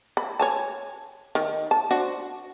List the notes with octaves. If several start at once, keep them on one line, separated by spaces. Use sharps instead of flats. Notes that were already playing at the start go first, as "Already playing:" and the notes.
B5
C#5 G#5 A5
D#3
A5
D4 F#4 C5